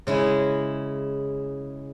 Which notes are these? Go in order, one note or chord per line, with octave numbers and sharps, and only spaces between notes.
C#3 G#3 E4